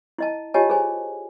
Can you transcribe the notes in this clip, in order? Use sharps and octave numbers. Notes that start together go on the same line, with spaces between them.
E4 D#5 A5
F4 G4 C#5 D#5 G#5 A5
G#4 A4 C5 G#5